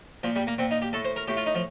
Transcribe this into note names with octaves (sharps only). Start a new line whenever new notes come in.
A#2 F3
G3
A#3
A#2 C4
D#4
G4
A2 A4
C5
A#4
A2 G4
F4
D#4
F3